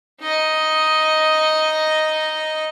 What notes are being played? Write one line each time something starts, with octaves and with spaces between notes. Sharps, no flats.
D#4 D#5